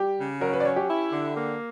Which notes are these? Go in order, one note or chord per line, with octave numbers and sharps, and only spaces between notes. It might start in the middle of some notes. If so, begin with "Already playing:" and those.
Already playing: G3 G4
C#3
F#3 A#4
C#5
B4
D5
C#4 C#5
G4
E4
D3
A#3